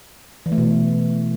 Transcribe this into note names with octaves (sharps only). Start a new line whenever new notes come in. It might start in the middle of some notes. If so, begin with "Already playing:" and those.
E3
A3
B2